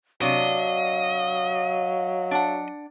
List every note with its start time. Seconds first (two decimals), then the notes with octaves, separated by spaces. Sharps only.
0.21 C3 F#3 D4 F#4 D#5 F5
2.31 D4 F#5